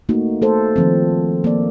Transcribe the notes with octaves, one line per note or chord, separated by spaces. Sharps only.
A3 A#3 D#4 F#4
A3 A4 C5
D#3 F3 C4
A#3 D5